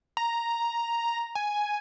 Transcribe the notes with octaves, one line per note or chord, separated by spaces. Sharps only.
A#5
G#5